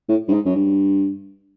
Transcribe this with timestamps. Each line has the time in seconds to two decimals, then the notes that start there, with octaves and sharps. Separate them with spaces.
0.09 A2
0.28 G2
0.33 G#2
0.46 F#2
0.55 G2